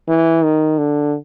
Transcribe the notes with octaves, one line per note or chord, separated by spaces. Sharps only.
E3
D#3
D3